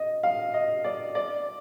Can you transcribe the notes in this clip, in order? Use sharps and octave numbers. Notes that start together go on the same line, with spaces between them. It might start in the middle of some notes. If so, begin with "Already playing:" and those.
Already playing: D#5
F5
D#5
D5
D5